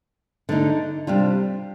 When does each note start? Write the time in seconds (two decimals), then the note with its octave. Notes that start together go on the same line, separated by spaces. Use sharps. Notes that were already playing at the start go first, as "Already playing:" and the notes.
0.49 D3 A3 C4 D#4
1.07 C3 G3 D4 F4